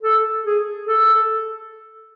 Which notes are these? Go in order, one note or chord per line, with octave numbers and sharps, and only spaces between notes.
A4
G#4
A4